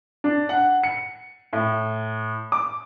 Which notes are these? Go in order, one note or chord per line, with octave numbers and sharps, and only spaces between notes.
D4
F#5
C#7
A2
D6